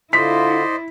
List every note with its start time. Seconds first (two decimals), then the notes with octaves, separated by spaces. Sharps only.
0.13 D3 E4 F4 C5 D5 D#5 B6